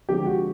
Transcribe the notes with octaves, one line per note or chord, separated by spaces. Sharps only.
D3 F3 G#3 C4 G4
F#4